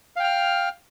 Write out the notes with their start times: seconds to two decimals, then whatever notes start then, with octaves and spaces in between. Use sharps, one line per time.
0.16 F5
0.20 G5
0.23 F6